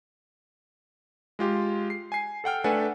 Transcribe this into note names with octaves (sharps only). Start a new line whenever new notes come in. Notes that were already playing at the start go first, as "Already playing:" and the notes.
G#3 F4 G4
C7
G#5 C7
A4 F#5 G5 F6
A3 D4 A4 B4 F#5 G#5